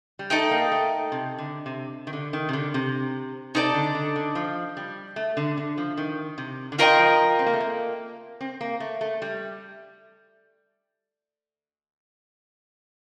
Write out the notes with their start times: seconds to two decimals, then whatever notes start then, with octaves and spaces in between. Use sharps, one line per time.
0.19 G3
0.30 A3 D#4 A4 D#5 G5
0.51 A#3
0.72 A3
1.12 C3
1.38 D3
1.66 C3
2.07 D#3
2.13 D3
2.33 D#3
2.49 C3
2.53 D3
2.74 C3
3.55 C3 D#4 A4 D5 A5
3.74 D3
3.95 D3
4.16 D3
4.35 F3
4.77 G3
5.16 A3
5.37 D3
5.57 D3
5.78 F3
5.97 D#3
6.38 C3
6.72 D3
6.78 D#3 F4 A#4 D#5 G5
6.90 D#3
6.99 F3
7.39 C4
7.46 A#3
7.53 A3
7.60 A#3
8.41 C4
8.61 A#3
8.80 A3
9.01 A3
9.22 G3